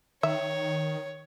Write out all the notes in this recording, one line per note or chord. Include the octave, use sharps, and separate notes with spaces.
D#3 C#5 E5